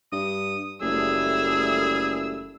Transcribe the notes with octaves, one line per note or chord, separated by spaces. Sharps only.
G2 D#6
F#1 A#2 G3 A3 G#4 E6